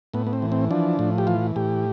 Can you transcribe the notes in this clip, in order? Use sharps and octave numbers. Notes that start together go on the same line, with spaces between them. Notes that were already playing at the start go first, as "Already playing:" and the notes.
A2 B3
B3
C4
E3
C4
F3 D4
A2
G4
E3 F4
A2 G4